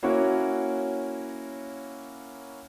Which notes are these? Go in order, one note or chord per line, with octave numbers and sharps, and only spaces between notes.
A#3 C#4 E4 F#4 C#5